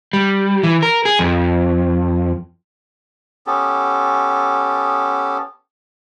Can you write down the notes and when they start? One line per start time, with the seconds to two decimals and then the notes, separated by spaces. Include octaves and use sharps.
0.13 G3
0.63 E3
0.83 A#4
1.05 G#4
1.19 F2
3.47 B3 C#4 G4 A4